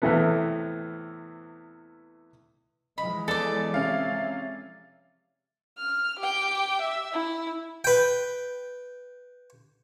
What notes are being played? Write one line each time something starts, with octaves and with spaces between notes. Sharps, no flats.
E2 A2 C3 E3 A3 B3
E3 F3 G#3 D#5 B5
E2 A4 D5
C3 C#4 E5 F5
F6
G4 G5
E5
E4
B4 G5